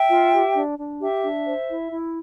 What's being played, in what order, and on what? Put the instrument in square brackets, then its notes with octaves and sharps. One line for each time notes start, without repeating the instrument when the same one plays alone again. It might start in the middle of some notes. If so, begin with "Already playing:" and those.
Already playing: [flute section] E5 G5
F4
G4
D4
D4
G4 E5
D4
C5
E4
E4